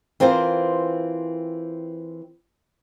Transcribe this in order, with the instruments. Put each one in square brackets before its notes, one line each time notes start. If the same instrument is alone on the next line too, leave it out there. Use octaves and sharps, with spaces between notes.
[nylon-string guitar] E3 C4 F4 A#4 C5